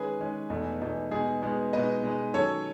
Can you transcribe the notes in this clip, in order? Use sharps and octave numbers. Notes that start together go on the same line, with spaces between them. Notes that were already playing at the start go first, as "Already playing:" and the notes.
Already playing: D#3 G#3 C#4 G#4 B4
D#3 G#3 C#4
E2 B2 A3 D#4
E2 B2 A3 D#4
B2 G#3 B3 D#4 G#4
B2 G#3 B3 D#4
B2 G#3 D#4 B4 D#5
B2 G#3 D#4
D#3 F#3 C#4 A4 C#5